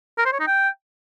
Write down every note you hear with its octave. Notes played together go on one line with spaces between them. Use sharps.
A#4
C5
C#5
D#4
G5